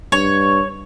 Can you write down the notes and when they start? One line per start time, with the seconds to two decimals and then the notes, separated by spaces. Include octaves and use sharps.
0.12 G2 C#5